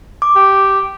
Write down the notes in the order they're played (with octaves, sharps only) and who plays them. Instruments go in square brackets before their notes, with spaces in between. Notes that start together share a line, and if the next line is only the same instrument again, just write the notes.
[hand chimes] D6
[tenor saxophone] G4